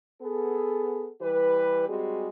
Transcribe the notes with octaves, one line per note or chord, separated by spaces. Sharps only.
B3 G#4 A4
E3 G3 G4 B4
G3 G#3 C4 F#4 G#4